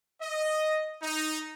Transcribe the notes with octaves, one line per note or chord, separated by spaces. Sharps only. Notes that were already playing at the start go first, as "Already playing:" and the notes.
D#5
D#4